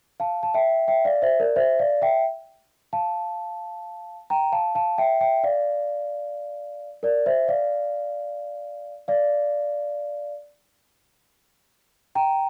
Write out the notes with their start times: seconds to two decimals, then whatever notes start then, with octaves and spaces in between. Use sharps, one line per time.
0.20 F5 A5
0.43 A5
0.54 E5 G5
0.88 E5 G5
1.05 D5 F5
1.22 C5 E5
1.40 A#4 D5
1.56 C5 E5
1.79 D5 F5
2.02 E5 G5
2.93 F5 A5
4.30 G5 A#5
4.52 F5 A5
4.75 F5 A5
4.98 E5 G5
5.21 E5 G5
5.44 D5 F5
7.03 A#4 D5
7.26 C5 E5
7.48 D5 F5
9.08 D5 F5
12.15 G5 A#5